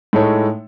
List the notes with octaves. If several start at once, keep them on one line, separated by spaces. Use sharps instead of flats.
A2 G#3 D#4 A4 C#5